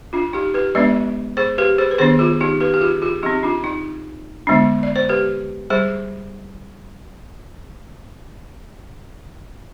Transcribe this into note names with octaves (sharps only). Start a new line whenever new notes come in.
D4 F4
D#4 G4
G4 B4
F3 G#3 B3 D4 B4 D5
G#4 C5
G4 B4
G#4 C5
B4
D#3 B3 D4 G#4 C5
F4 G#4
D#4 G4
G4 B4
G4
F4 G#4
F4 G#4
F3 C4 D#4 G4
D4 F4
D#4
D3 G#3 B3 D4
D5
C5
G4 B4
G3 G#4 C5